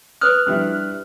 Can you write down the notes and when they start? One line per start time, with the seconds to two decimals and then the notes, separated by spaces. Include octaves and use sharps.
0.21 B4 D#6 F6 F#6
0.47 G2 G3 E4